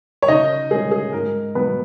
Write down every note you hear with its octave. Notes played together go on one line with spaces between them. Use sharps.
C#5
C#3 D#4 D#5
G#3 C#4 G#4
G#4
G#2 A#4
F#3 B3 D#4 B4